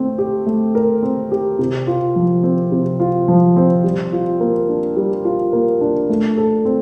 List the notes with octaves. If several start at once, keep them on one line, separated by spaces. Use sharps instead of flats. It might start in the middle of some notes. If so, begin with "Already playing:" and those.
Already playing: A3 C4
G4
A3
A#4
C4
G4
C3
F4
F3
C4
C3
F4
F3
C4
G3
F4
A#3
D4
G3
F4
A#3
D4
A3
A4
C4